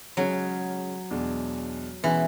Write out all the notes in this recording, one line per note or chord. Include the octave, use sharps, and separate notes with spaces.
C#3 F#3 G#3 C#4
E2 B2 G#3 D4
B2 E3 G#3 C#4 F#4